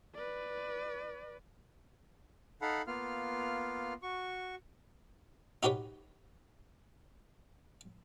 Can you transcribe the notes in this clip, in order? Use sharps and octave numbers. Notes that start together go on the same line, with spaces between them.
B4 D5
D#4 A4 F5 F#5 B5
A#3 B3 F4 F5 F6
F#4 C#6
D#4 F#4 G4 B4 C#5